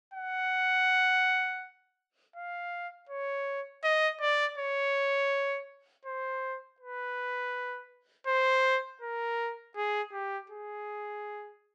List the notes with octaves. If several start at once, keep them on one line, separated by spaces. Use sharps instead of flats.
F#5
F5
C#5
D#5
D5
C#5
C5
B4
C5
A#4
G#4
G4
G#4